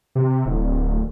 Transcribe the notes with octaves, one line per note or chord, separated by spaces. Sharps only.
C3
D1